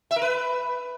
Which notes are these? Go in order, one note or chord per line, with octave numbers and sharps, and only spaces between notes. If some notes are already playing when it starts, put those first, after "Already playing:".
E5
A#4
B4